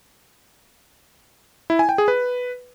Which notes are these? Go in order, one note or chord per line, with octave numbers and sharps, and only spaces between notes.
E4
G#5
G5
G#4
B4